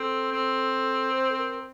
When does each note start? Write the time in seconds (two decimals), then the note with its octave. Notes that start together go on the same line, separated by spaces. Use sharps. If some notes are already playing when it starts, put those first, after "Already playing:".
Already playing: C4 A4
0.32 C4
1.11 C5
1.30 A4
1.37 A#4